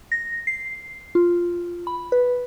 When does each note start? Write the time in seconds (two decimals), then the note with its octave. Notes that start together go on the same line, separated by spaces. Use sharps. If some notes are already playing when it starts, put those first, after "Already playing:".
0.12 A#6
0.47 C7
1.15 F4
1.87 B5
2.12 B4